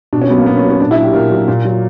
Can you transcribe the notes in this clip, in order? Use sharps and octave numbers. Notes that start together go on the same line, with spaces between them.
B2 D4
C#4
F#3 B3
A#3
B2 B3
C#4
F#3
C#4
A#2 D4
E4
F#3
G4
A#2 A#4
F#3
A#2
F#3